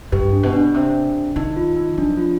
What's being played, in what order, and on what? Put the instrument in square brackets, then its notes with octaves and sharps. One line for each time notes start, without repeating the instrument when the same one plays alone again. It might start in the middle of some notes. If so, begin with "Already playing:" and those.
[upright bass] G2 [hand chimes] G4 B4
[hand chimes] D4
[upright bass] B2
[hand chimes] D4
[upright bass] C3
[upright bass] D#3 [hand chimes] D#4
[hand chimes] F4
D#4
[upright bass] F3 [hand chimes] D4
[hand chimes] F4